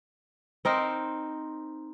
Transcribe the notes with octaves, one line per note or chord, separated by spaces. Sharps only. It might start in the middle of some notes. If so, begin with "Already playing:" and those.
C4 D#4 A#4 C5